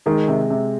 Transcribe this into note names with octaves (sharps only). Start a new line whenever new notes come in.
D#3 G#3
C3
C3